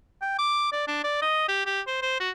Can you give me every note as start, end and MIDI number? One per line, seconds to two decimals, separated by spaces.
0.22 0.36 79
0.39 0.69 86
0.72 0.85 74
0.88 1.00 62
1.04 1.19 74
1.22 1.47 75
1.48 1.65 67
1.66 1.81 67
1.87 2.00 72
2.02 2.18 72
2.20 2.30 66